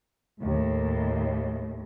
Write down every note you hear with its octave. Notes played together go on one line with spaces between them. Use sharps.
D#2 A2